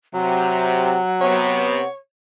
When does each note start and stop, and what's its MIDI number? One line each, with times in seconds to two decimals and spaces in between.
0.14 0.96 48
0.14 1.74 54
0.14 1.89 78
1.21 1.82 48
1.21 1.82 59
1.21 1.96 73